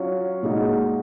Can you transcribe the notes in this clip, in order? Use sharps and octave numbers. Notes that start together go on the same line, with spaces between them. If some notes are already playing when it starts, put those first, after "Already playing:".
Already playing: F#3 C#4 F4
A#2 G#3 D#4 F#4